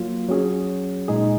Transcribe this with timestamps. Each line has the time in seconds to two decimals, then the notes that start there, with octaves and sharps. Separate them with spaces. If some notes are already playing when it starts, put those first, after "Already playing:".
Already playing: F#3 A#3 F4
0.28 F#3 C#4 G#4
1.08 A#2 G#3 D#4 G#4